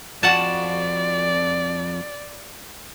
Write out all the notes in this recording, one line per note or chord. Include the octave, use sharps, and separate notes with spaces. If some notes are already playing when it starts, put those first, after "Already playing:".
F2 F#4 D5 F#5 A5